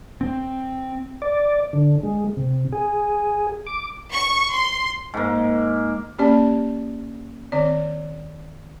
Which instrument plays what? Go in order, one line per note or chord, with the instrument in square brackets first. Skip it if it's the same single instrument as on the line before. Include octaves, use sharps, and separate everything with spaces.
[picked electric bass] C4
[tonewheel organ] D5
D3
G#3
C3
G#4
D6
[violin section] C#6
C6
[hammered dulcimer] G#2 A#3
[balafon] A#3 C#4 G4 D5 A5
D#3 C4 D5